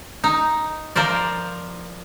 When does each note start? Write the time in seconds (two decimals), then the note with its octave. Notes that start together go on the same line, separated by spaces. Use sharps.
0.24 D#4
0.95 F3 A#4 C5 D5